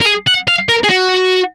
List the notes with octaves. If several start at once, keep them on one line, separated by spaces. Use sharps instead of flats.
A#4
G#4
F#5
F5
A#4
G#4
F#4